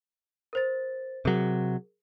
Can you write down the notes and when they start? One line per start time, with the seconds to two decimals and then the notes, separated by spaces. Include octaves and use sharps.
0.53 A#4 C5 A6
1.25 C3 F#3 G#4 A#4